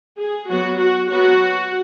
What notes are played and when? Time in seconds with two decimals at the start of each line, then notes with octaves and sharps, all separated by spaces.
0.19 G#4
0.49 F#3 B3 F#4
0.80 F#4
1.10 F#3 B3 F#4